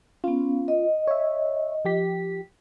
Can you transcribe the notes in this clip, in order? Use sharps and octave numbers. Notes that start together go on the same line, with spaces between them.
B3 C#4 F4
D#5
C#5 E5
F3 G4 B6